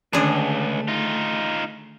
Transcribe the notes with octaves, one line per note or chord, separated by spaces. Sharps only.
C#2 D3 D#3 A3 C#4 D4 G#4
D#4 F4